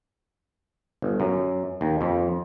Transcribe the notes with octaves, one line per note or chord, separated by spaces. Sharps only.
G1
F#2
D#2
F2